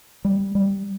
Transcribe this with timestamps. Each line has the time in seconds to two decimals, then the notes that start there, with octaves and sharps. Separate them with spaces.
0.25 G3
0.55 G3